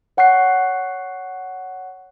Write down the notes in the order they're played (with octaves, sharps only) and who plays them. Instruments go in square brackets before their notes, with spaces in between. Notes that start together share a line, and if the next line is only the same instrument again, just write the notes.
[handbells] C#5 F#5 C#6 F#6 C7